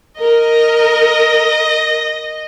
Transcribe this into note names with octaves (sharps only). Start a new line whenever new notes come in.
A#4 D#5